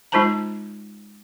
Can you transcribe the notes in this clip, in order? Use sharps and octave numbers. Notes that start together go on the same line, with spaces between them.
G#3 D#4 F4 C5 A5 A#5